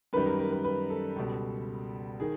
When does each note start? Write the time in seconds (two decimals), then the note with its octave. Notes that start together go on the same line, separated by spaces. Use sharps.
0.13 F#2 D#3 G3 B4
0.26 A#4
0.39 A#4
0.52 B4
0.64 B4
0.90 A4
1.16 C#2 B2 G3
2.20 D#3 G#4